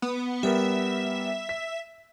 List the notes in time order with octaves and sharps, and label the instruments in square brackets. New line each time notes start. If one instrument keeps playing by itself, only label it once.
[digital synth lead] B3
[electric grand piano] G3 B3 A#4 [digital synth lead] E5
[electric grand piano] B6